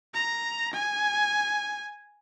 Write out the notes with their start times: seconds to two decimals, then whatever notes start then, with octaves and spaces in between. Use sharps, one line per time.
0.14 A#5
0.74 G#5